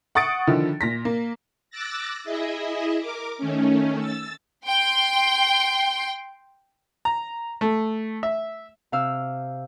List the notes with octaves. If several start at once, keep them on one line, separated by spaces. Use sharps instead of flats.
F#5 C#6 D#6 A6 C#7 D7
D3 D#3 F3 E4
A#2 A#6 B6
A#3
D6 E6 F#6 A6 A#6
E4 G#4 D#5 E5
A#4 D6
D#3 A3 C#4
E6 A6
G5 C6
A#5
A3
E5
C3 F5 E6